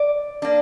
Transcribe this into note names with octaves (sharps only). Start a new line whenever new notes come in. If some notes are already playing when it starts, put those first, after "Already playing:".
Already playing: D5
A#3 D4